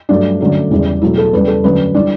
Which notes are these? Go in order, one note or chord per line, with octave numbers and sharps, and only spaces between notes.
G2 F#3 A3 D4
F#2 D3 F#3 A3
E2 C#3 E3 G3
B2 F#3 A3 E4
A4
E2 C#3 G3 B4
A4
F#2 D3 F#3 A3 B4
E3 G3 D4